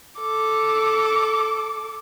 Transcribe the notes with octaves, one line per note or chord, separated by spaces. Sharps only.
A4 D6